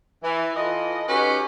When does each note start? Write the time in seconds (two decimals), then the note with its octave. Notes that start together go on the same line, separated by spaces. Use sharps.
0.23 E3
0.55 E3 F4 A4 D#5
1.08 C#4 D#4 F#4 G4 B4